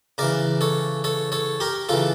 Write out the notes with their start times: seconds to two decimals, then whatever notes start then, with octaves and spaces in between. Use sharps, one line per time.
0.18 C#3 E3 A#4 D5
0.61 A4 C#5
1.04 A4 C#5
1.32 A4 C#5
1.60 G4 A#4
1.89 C#3 E3 F4 A4